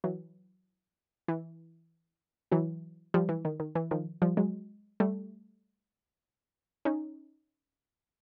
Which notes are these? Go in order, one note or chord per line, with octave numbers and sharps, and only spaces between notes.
E3 F#3
E3
E3 F#3
F3 G3
E3
D#3
D#3
E3
D#3 F3
F3 G3
F#3 G#3
G3 A3
C#4 D#4